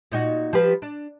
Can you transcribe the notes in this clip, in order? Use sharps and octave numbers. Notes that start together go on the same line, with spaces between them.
A#2 D#4 F#4
F3 G4 B4
D4